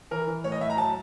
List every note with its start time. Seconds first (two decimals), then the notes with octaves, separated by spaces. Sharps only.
0.11 E3 A#4
0.27 E3
0.44 A2 C#5
0.52 D#5
0.61 A2 E5
0.70 A#5
0.77 F#3 A5